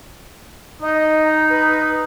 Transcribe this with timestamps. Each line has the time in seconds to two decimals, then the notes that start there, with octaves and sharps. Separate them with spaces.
0.82 D#4 D#5
1.24 A#5
1.49 B4